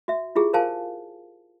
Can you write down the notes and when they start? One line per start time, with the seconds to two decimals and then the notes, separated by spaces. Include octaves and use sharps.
0.08 F#4 E5
0.36 E4 F4 G4 G#4
0.53 F4 A#4 C5 F5 G#5 A5